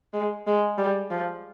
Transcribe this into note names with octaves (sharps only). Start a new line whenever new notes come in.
G#3
G#3
G3
F3